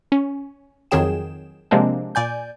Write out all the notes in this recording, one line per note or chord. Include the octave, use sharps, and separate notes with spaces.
C#4
F2 D#3 F#3 G#4 G5 E7
C3 F3 G#3 A#3 C4 D4
A#2 D5 G#5 G6